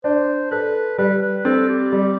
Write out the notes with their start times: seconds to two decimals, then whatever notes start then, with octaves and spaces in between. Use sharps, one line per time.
0.04 D4 C5
0.51 A4 B4
0.98 G3 B4
1.22 B4
1.45 C4 A4
1.69 G4
1.92 G3